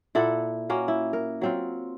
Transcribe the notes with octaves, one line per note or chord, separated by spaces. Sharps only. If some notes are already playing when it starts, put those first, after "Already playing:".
A#2 E4 A4 F#5
A#3 C#4 F#4
E4
A#4
F#3 C4 F4